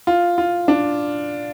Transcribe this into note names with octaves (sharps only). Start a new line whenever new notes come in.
F4
F4
D4